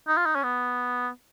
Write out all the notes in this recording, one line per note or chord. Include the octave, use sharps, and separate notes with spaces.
D#4
F4
D#4
C#4
B3